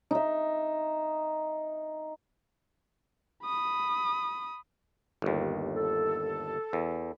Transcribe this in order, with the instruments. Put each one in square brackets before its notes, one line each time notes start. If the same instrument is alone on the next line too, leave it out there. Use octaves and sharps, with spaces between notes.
[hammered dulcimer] D#4 E5
[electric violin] B5 D#6
[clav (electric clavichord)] G1 D#2
[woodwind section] A4
[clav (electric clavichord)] E2